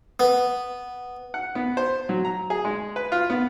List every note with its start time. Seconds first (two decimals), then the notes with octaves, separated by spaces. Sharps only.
0.20 B3
1.34 F#5
1.55 B3
1.77 C5
2.09 F#3
2.25 A#5
2.50 G#4
2.65 G#3
2.96 B4
3.12 F4
3.30 B3